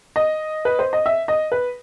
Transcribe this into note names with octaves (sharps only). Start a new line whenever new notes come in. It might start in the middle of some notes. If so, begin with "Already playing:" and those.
D#5
B4
C5
D#5
E5
D#5
B4